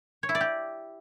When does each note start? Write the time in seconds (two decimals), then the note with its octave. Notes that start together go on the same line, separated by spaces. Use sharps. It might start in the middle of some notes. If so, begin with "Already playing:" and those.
0.23 C#5
0.29 E4
0.35 D5
0.41 G4